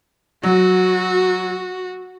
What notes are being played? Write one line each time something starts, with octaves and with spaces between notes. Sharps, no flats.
F#3 F#4